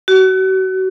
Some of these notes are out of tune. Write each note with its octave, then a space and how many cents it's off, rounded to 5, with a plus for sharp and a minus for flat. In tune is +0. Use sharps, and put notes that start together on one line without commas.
F#4 +35